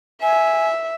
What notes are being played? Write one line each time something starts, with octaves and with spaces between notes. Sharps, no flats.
E5 G#5